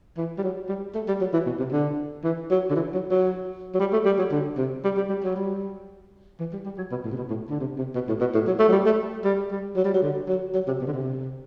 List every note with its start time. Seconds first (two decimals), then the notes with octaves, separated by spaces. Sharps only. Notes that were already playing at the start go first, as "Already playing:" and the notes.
0.17 E3
0.38 G3
0.43 F#3
0.69 G3
0.95 A3
1.08 G3
1.21 F#3
1.33 E3
1.46 B2
1.59 C3
1.72 D3
2.24 E3
2.50 F#3
2.70 D3
2.75 E3
2.94 F#3
3.11 F#3
3.74 F#3
3.80 G3
3.93 A3
4.06 G3
4.18 F#3
4.31 D3
4.57 C3
4.84 G3
4.97 G3
5.09 G3
5.24 F#3
5.36 G3
6.40 E3
6.53 G3
6.66 G3
6.78 F#3
6.91 B2
7.04 A2
7.12 C3
7.17 B2
7.30 A2
7.49 D3
7.60 C3
7.78 C3
7.95 B2
8.08 A2
8.20 B2
8.34 A2
8.47 F#3
8.59 A3
8.68 F#3
8.72 G3
8.86 A3
9.24 G3
9.51 G3
9.76 F#3
9.85 G3
9.94 F#3
10.02 D3
10.28 F#3
10.54 F#3
10.67 C3
10.80 B2
10.87 D3
10.93 C3